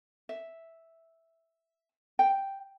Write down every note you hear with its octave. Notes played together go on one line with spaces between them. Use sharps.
E5
G5